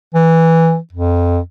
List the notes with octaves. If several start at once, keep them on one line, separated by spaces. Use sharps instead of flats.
E3
F2